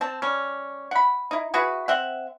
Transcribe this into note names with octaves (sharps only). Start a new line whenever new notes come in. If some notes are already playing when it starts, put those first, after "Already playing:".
C4 A5
G3 C#4
F#5 B5
D#4 E4
E4 F#4 G#4 B4
C4 E5 F#5